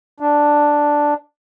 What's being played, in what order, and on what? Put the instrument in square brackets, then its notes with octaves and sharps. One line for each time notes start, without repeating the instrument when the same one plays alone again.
[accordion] D4